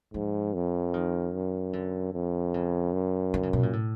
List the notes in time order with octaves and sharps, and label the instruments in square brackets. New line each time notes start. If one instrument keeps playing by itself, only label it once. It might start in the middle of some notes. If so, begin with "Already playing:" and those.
[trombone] G#2 [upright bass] F3
[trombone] F2
[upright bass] D#3
[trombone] F#2
[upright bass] D3
[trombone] F2
[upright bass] C#3
[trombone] F#2
[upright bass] D3
C#3
B2
A#2
A2